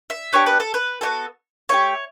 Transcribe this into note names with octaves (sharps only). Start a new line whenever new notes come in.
E5
B3 D4 G4 C#5
B4
A4
B4
B3 D4 F#4 A4
A3 E4 G4 C#5